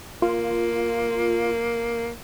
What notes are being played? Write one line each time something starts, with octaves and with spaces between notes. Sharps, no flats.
A#3 F4